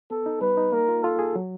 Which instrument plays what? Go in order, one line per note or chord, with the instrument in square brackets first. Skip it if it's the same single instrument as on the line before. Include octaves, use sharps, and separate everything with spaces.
[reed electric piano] B3 [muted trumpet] A4
[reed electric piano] D#4
[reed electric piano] G3 [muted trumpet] B4
[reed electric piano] D#4
[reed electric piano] A#3 [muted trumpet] A#4
[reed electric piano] F4
[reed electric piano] F4 [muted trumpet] A4
[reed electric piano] G#4
F#3